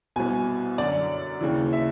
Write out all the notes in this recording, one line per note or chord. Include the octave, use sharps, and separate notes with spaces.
C2 B2 G#5
F#2 D3 D5
D#2 C#3 E3
E5